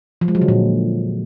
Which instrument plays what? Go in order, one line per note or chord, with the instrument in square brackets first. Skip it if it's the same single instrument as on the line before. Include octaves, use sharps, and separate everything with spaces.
[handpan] F3
G#3
F#3
D3
A#2